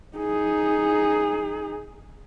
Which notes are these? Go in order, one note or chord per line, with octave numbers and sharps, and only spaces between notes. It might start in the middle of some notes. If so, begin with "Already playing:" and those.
D#4 G#4